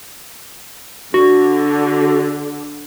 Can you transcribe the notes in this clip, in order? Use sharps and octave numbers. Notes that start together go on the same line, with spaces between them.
D3 F#4